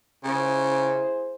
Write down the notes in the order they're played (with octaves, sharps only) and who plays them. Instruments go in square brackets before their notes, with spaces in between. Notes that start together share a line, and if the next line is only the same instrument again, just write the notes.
[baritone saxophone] C#3 [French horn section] E4 G#4 C5